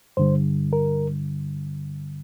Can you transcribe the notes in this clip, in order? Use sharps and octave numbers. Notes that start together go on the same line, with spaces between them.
G2 D3 G3 C5
A#4